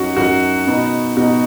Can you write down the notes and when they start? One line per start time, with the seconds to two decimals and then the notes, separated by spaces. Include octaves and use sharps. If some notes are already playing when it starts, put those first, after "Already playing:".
Already playing: F#2 F#3 C#4 D#4 F#4
0.16 F#2 F#3 D#4 F#4
0.67 B2 B3 D#4
1.16 B2 B3 D#4 F#4